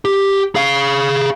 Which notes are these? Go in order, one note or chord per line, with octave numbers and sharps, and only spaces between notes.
G4
G#4 F5